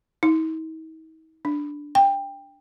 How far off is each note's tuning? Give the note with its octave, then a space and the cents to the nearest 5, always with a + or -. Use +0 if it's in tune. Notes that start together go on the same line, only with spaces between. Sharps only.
D#4 +45
D4 +0
G5 +15